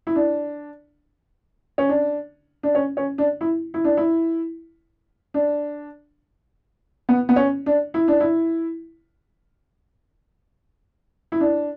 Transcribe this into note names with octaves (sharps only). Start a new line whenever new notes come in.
E4
D4
C#4
D4
D4
C#4
C#4
D4
E4
E4
D4
E4
D4
B3
B3
C#4
D4
E4
D4
E4
E4
D4